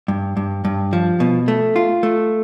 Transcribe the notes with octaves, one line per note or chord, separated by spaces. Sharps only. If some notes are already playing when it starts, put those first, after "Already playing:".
G2
G2
G2
F3
B2
A3
F4
A3